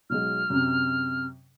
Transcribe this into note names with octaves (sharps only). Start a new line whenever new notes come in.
B1 F#3 G#3 F6
F#2 C3